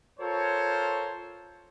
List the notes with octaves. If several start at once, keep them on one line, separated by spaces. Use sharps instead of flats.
F4 A4 A#4 C5 C#5